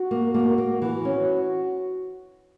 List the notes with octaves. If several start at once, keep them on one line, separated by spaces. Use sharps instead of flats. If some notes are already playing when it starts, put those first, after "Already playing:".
Already playing: F#4
A#3
A#3
A#3
E3 F#4
C#4